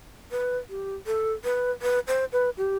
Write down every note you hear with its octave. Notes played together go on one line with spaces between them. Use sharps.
B4
G4
A4
B4
B4
C5
B4
G4